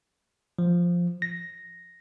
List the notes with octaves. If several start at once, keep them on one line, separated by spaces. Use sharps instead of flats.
F3
A#6